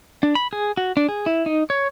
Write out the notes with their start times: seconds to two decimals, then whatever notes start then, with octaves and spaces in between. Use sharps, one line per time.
0.23 D4
0.35 B5
0.53 G#4
0.77 F#4
0.97 D4
1.09 G#4
1.26 E4
1.46 D#4
1.70 C#5